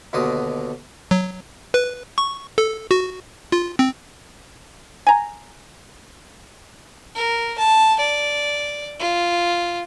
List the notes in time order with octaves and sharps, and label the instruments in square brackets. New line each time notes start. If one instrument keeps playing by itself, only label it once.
[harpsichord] D#2 B2 D3 F#4 C6 D#6
[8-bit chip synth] F#3
B4
C#6
A4
F#4
F4
C4
[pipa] G#5 A#5
[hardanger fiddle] A#4
A5
D5
F4